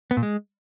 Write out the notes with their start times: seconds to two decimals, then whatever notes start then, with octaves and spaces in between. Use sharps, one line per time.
0.11 B3
0.17 A#2
0.23 G#3